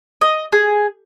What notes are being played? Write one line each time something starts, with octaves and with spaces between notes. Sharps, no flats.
D#5
G#4